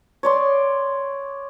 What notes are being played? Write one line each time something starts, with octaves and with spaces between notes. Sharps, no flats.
C#5 D5 C6